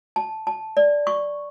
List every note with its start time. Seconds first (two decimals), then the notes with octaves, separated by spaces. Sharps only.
0.16 A5
0.47 A5
0.77 D5
1.07 C#6